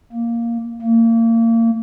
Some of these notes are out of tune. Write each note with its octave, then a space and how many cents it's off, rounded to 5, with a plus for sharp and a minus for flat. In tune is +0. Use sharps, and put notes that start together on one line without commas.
A#3 +0
A#3 -30